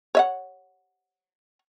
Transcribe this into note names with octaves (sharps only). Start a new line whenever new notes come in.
C#5 E5 F#5